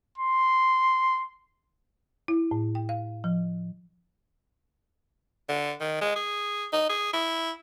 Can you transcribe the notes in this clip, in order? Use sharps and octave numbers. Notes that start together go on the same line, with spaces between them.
C6
E4
A2
G5
F5
F3
D3
D#3
G#3
G#4
D#4
G#4
E4